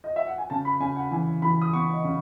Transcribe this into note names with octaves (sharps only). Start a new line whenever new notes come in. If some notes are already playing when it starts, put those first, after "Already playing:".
D#5
E5
F#5
G#5
C#3 A5
B5
C#3 G#5
F#5
E3 G#5
E3 B5
D#6
B3 C#6
D#5
C#3